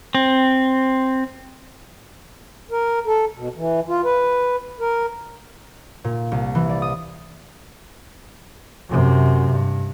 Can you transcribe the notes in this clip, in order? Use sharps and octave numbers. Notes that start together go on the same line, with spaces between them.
C4
A#4
A4
B2
E3
F4
B4
A#4
A#2
C2
E3
D5
D#6
F#2 C3
G2